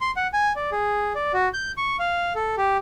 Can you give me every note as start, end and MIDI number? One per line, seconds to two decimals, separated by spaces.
0.01 0.11 84
0.16 0.27 78
0.33 0.53 80
0.56 0.70 74
0.72 1.13 68
1.15 1.32 74
1.33 1.49 66
1.54 1.72 91
1.77 1.97 85
1.99 2.33 77
2.35 2.55 69
2.57 2.77 67